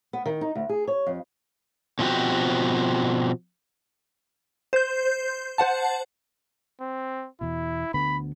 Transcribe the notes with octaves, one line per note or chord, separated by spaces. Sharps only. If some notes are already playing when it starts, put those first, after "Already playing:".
B3
D#3
D#4
D2
G#4
C#5
F2
B2 F3 A3 C4 F#4 G4
C5 G6
C5 F#5 A5
C4
E2 B2 E4
D2 D3 B3 B5